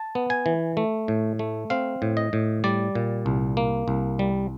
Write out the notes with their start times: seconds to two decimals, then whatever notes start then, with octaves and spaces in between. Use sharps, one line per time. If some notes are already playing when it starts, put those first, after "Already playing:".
Already playing: A5
0.15 B3
0.30 G#5
0.46 E3
0.77 A3
1.08 A2
1.39 A3
1.70 C4 F5
2.02 A2
2.17 D#5
2.33 A2
2.64 G3 D5
2.95 A#2
3.26 C2
3.57 A#3
3.88 C2
4.19 G3